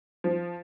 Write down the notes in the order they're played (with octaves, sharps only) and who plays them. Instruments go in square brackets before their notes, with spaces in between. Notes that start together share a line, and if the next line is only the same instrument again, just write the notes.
[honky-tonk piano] F3